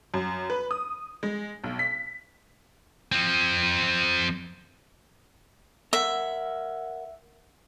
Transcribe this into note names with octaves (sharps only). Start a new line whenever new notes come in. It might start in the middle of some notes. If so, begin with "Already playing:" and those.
F#2
B4
D#6
G#3
B1
B6
F3 C4
A#4 E5 F#5